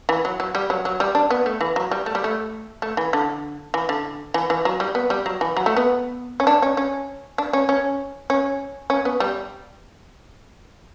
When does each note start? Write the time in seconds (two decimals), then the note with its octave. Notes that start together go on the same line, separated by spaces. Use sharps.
0.09 E3
0.25 F#3
0.40 F#3
0.55 G3
0.70 F#3
0.85 F#3
1.00 G3
1.15 D4
1.30 B3
1.46 A3
1.61 E3
1.76 F#3
1.91 G3
2.06 A3
2.15 G3
2.24 A3
2.82 A3
2.97 E3
3.13 D3
3.74 E3
3.89 D3
4.34 E3
4.50 E3
4.65 F#3
4.80 G3
4.95 B3
5.10 G3
5.26 F#3
5.41 E3
5.57 F#3
5.66 A3
5.76 B3
6.40 C#4
6.47 D4
6.62 C#4
6.77 C#4
7.38 D4
7.53 C#4
7.69 C#4
8.30 C#4
8.90 C#4
9.05 B3
9.20 G3